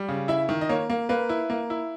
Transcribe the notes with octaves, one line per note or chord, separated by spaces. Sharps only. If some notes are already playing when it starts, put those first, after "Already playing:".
Already playing: G3
C#3
E4 E5
D#3
D#5
A#3 C#5
A#3
A#3 B4
E4
A#3
E4